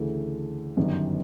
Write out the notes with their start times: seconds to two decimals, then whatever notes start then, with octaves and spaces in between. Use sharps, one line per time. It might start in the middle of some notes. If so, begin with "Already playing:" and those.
Already playing: D2 C#3 E3 A3
0.77 G1 F#2 D#3 G3 B3